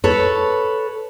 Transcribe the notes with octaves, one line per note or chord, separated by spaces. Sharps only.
A4 B4 C#5